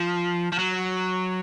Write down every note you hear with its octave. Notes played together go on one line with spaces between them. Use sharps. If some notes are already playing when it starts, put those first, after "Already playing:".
Already playing: F3
F3
F#3